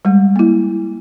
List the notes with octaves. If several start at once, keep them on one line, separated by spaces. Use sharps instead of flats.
G3 G#3
A#3 E4